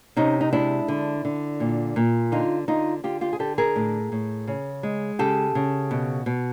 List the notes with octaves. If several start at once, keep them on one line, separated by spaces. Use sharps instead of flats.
C3 C#4 D#4
D#4
G#3 D4 E4
D3
D3
A#2
A#2
D3 D#4 F4
D3 D#4 F4
D3 F4 G4
F4 G4
G#4
D3 G4 A4
G#4 A#4
A2
A2
C#3
G#3
C#3 G4 A4
C#3
B2
B2